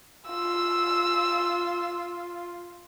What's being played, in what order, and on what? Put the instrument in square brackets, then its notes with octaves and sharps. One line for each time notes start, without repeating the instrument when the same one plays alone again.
[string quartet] F4 [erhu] E6